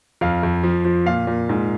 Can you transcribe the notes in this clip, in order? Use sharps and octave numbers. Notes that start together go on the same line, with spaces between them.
F2 F5
F2
F3
F3
A#2 F5
A#2
G#2